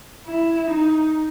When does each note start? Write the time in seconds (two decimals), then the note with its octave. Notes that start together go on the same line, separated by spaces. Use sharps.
0.27 E4
0.70 D#4